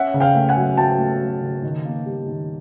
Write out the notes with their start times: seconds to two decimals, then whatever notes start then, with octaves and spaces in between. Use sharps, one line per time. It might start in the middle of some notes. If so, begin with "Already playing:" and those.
Already playing: C#4 E5 F#5
0.14 C#3
0.20 F5 G5
0.35 A3
0.49 F#5 G#5
0.57 F#3
0.77 F#3 G5 A5
0.99 A3
1.20 F#3
1.41 C#3
1.62 D#3
1.85 A#3
2.06 G3
2.26 D#3